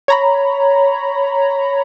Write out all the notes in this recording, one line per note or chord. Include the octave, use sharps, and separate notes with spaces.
C#5 A#5 B5